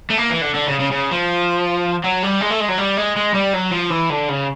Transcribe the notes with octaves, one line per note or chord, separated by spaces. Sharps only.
A3
A#3
E3
D3
D3
C#3
C#3
C#3
F3
F#3
G3
G#3
A3
G#3
F#3
G3
G#3
G#3
G3
F#3
F3
E3
D3
C#3